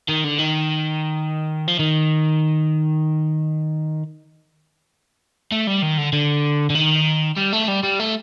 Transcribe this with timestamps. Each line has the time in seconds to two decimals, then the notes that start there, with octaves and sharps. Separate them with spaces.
0.08 D#3
0.24 D3
0.39 D#3
1.68 F3
1.79 D#3
5.52 A3
5.67 G3
5.82 D#3
5.98 D3
6.13 D3
6.70 D3
6.75 D#3
7.37 G3
7.53 A3
7.68 G3
7.83 G3
8.00 A3